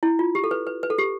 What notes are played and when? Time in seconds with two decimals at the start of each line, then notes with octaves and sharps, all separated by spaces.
0.03 E4
0.19 F4
0.35 G4
0.44 A4
0.51 B4
0.67 B4
0.83 B4
0.90 A4
0.98 G4